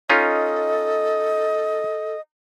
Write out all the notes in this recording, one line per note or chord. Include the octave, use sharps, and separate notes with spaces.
C#4 D#4 F4 A4 D#5